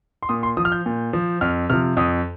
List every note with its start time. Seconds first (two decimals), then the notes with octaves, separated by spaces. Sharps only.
0.23 C6
0.29 A#2 D#6
0.43 C6
0.57 F3 D#6
0.65 F6
0.72 G6
0.86 A#2
1.13 F3
1.41 F2 F6
1.70 C3 F3 F6
1.97 F2 D#6